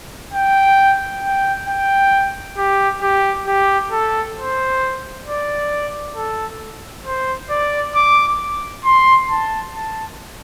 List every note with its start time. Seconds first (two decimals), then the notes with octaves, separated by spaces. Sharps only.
0.33 G5
1.23 G5
1.68 G5
2.58 G4
3.02 G4
3.47 G4
3.92 A4
4.37 C5
5.26 D5
6.16 A4
7.06 C5
7.50 D5
7.95 D6
8.85 C6
9.30 A5
9.74 A5